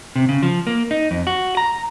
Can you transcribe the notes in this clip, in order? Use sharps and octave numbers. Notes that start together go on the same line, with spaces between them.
C3
C#3
F3
A#3
D#4
F2
F#4
A#5